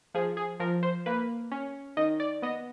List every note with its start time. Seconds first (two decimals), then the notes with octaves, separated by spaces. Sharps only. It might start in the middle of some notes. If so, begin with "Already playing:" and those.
0.14 F3 G#4
0.37 G#4
0.60 F3 A#4
0.83 C5
1.06 A#3 B4
1.52 C#4
1.97 D#3 D#5
2.20 D5
2.42 B3 D#5